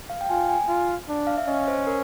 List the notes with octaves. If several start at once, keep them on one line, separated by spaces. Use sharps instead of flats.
F5
G5
F4 G#5
G#5
F4
D4
F5
E5
C#4 D#5
C5
A#4